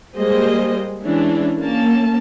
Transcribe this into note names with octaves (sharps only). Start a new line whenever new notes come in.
G3 G#3 A#3 G#4 C5 D#5
E3 G#3 C#4 D4 E4
A#3 C#4 A5